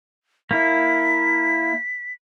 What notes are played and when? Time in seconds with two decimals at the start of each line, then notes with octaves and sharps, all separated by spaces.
0.51 A#3 E4 B6